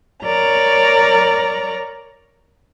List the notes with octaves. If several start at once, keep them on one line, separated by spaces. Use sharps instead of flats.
A#4 C#5 D5 A#5